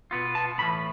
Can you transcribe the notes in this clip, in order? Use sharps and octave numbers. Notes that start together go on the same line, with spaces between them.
B2 B3 F4
A5
B1 A2 E3 B5